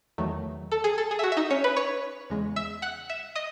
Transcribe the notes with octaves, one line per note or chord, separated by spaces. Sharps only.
E2 D#3 F#3 A3
A4
G#4
A4
G#4
E5
F#4 F#5
E5
D#4 D#5
C#4 C#5
B4 B5
C#5 C#6
E2 C#3 G#3
E5 E6
F#5 F#6
E5 E6
D#5 D#6